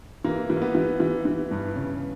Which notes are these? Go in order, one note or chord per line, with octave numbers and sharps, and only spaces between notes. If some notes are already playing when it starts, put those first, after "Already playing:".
E3 A#3
E3
A#3
B3
E3
E3
E3
G2
C#3